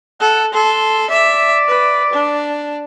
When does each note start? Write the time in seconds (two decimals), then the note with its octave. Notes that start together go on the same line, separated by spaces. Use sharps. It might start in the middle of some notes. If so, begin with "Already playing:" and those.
0.20 A4 F#5
0.54 A4 C6
1.11 D5 E5
1.69 B4
2.13 D4